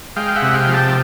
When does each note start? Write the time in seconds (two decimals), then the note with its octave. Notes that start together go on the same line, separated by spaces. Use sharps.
0.16 G#3 F5 G5
0.36 E5 F#5
0.42 C3
0.54 F5 G5
0.67 F3
0.73 G5 A5